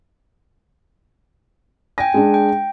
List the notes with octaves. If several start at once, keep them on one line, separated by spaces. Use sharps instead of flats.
G5 G#5 A#6
G#3 D4
G5